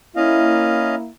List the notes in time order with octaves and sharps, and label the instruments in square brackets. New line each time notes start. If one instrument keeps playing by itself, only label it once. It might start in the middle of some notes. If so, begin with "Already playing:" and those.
[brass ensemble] A#3 E4 [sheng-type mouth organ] C#4 D#5 F5